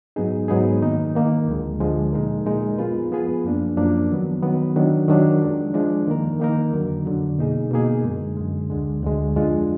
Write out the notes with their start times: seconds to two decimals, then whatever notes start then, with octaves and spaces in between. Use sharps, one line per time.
0.16 G#2 F#3 B3 D#4 G#4
0.48 G#2 F#3 B3 D#4 G#4
0.82 D#3 A#3 D#4
1.15 D#3 A#3 D#4
1.48 D2 D3 F3 G#3
1.80 D2 D3 F3 G#3
2.13 A#2 G#3 D#4 A#4
2.46 A#2 G#3 D#4 A#4
2.78 F3 B3 F4 G#4 B4
3.11 F3 B3 F4 G#4 B4
3.44 F#2 F3 A#3 D4
3.77 F#2 F3 A#3 D4
4.10 D#3 F#3 B3
4.43 D#3 F#3 B3
4.76 D#3 F#3 D4
5.08 D#3 F#3 D4
5.41 F3 G#3 D4
5.74 F3 G#3 D4
6.07 D#3 A#3 D#4 A#4
6.40 D#3 A#3 D#4 A#4
6.73 F2 D3 F#3
7.06 F2 D3 F#3
7.39 B2 A#3 D#4 G#4
7.71 B2 A#3 D#4 G#4
8.04 F#2 D3 G#3
8.37 F#2 D3 G#3
8.70 D2 D3 G#3
9.03 D2 D3 G#3
9.35 F2 F3 G#3 D4 F4